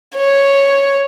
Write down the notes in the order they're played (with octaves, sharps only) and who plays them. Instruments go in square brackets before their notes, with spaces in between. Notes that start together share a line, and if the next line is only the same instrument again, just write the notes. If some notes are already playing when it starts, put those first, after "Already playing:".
[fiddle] C#5